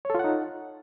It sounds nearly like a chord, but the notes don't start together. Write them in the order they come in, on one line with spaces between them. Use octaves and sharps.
C#5 A4 F4 F#5 D#4